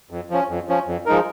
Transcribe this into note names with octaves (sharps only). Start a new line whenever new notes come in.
F2
F3 C#4
F2
F3 C#4
F2
F3 G#3 D#4 A#4